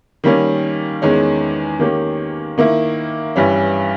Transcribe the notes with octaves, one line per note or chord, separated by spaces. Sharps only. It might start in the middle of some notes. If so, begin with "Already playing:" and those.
D#3 G3 A#3 C#4
E2 D#3 G#3 C#4
D#3 A#3 C#4 G4
D#3 A#3 E4
G2 E3 G3 C#4